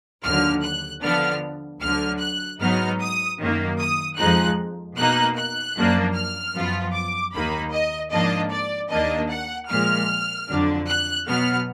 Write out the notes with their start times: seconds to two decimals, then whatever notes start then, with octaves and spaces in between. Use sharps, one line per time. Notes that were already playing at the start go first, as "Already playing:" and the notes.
0.24 D#2 D3 F#3 F6
0.63 F#6
1.02 D3 F3 B3 D4 F6
1.82 D2 D3 F#3 F6
2.20 F#6
2.60 G#2 F#3 B3 D#4 F6
3.00 D#6
3.39 F#2 D#3 A#3
3.79 D#6
4.18 F2 F3 G#3 D#4 F#6
4.97 B2 A#3 D#4 F#6
5.37 F#6
5.76 F#2 F3 A#3 D4
6.15 F6
6.55 F#2 F3 B3 F4
6.94 D6
7.33 D#2 D#3 A#3 D#4 B5
7.73 D#5
8.12 G#2 F3 A#3 D4 D#5
8.52 D5
8.91 D#2 D#3 A#3 D4 D#5
9.30 F#5
9.70 A#2 F3 G#3 F6
10.49 F2 D3 F#3 D4
10.88 F#6
11.28 B2 F#3 B3 F6